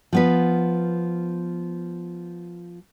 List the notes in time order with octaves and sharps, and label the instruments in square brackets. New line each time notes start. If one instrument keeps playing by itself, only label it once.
[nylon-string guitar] F3 B3 B4